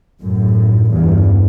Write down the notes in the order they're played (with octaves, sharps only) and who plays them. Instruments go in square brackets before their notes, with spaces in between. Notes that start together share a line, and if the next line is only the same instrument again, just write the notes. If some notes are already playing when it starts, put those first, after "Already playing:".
[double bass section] F#2 A2
E2 G2